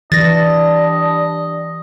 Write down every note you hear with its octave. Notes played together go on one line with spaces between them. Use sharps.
E3 G3 D4 D#5 A6 A#6